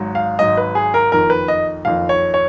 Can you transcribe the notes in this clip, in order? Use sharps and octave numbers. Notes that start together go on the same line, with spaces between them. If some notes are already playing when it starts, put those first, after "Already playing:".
Already playing: G#1 G#2 F#3
F5
G#1 G#2 F#3 D#5
B4
G#4
A#4
F#1 F2 D#3 A#4
B4
D#5
F#1 F2 D#3 F5
C#5
C#5